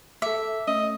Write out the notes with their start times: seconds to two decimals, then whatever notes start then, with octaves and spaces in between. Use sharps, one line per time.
0.22 A4 E5 D6
0.67 A3 C#4 D#5